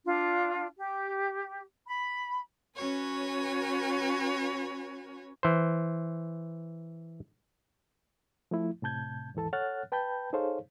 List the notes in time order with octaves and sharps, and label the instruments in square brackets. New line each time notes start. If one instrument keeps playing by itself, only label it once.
[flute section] D4 F4
G4
B5
[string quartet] C#4 F#4 B4 C#5 G#5
[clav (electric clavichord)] E3 C5
[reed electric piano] F3 A3 E4
A2 C3 A5 G6 G#6
D#2 G#2 E3 A4 A5
A4 C#5 F#5 F6 F#6 A6
B4 G5 A5 B5 G6
D#4 G#4 A4 C5 C#5 F5